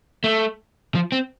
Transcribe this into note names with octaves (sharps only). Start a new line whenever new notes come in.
A3
F3
C4